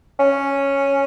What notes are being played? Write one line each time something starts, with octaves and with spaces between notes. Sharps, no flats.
C#4